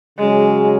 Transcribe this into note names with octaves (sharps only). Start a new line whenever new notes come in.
C#3 F#3 G#3 C#4